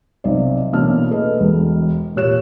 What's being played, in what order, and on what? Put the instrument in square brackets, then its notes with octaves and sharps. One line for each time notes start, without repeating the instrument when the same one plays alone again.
[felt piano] B1 C3 D5
A1 B2 A#3 D4 F6
G#4 A4 B4 D#5
E1
A#2 G4 C#5 F#6 E7